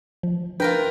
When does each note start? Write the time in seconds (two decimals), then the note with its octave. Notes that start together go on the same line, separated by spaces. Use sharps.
0.23 F3
0.60 D4 F4 A#4 B4 G5 A#6